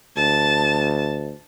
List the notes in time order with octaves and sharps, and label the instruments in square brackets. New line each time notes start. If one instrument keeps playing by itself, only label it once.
[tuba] D2 [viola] A5